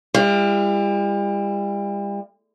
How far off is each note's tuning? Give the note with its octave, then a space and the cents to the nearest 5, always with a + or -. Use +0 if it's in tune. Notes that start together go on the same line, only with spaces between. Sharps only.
G3 +40 E4 +45